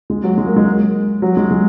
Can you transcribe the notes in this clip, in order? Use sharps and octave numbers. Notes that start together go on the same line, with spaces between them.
G#3
F#3
G#3
A#3
G#3
F#3
G#3
G#3